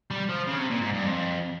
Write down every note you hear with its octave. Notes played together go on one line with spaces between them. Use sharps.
G3
F3
C#3
C3
A#2
G#2
G2
F2